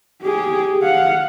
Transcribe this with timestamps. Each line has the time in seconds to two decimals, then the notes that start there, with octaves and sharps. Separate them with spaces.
0.23 G4 G#4
0.83 F5 F#5